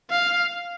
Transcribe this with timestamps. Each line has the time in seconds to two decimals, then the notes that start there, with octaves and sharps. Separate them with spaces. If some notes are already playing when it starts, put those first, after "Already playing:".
0.10 F5